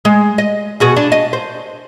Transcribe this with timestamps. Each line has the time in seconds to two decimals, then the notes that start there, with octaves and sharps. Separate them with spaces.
0.05 G#3
0.38 D#5
0.80 B2 F#4 G#4
0.97 D4
1.12 D#5
1.33 C5